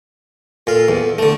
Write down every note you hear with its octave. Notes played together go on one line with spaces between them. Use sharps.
A#2 A4 F5
E2
D3 A3